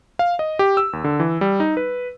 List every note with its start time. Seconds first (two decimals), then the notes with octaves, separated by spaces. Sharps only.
0.19 F5
0.39 D#5
0.59 G4
0.77 E6
0.93 D#2
1.04 D3
1.20 E3
1.41 G3
1.60 D#4
1.77 B4